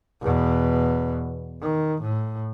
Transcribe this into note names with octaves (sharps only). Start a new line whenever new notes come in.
E2 B2
D#3
A2